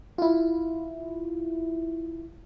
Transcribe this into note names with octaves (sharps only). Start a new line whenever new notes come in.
E4 F4